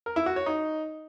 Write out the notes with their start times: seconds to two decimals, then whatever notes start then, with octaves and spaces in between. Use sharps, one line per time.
0.06 A#4
0.16 E4
0.26 F#4
0.36 C#5
0.46 D#4